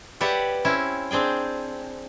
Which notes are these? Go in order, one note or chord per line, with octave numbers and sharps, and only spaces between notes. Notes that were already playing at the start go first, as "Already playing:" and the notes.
G4 B4 C#5 D5 E5 F#5
C4 C#4 E4
C4 D4 G#4 G5